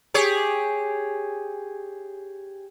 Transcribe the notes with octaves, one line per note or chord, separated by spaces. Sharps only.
G4 G#4 C#5